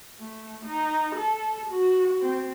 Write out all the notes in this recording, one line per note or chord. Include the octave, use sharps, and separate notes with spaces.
A3
D#4
A4
F#4
C4